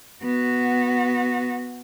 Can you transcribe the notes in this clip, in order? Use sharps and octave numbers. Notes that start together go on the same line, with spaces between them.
B3 F#4